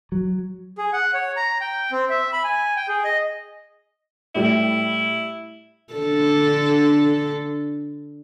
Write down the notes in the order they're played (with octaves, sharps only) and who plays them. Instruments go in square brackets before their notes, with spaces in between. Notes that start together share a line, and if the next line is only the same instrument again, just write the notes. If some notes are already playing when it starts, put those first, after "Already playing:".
[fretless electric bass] F#3
[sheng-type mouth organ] G#4
F#5
C#5
A#5
G5
C4
E5
B5
G#5
G5
G#4
D#5
[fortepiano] A2 G3 [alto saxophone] E4
[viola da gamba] D3 D4 A4